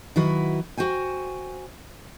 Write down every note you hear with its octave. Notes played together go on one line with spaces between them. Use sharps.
D#3 F#3 E4 F#4 B4
F#4 C5 G5 G#5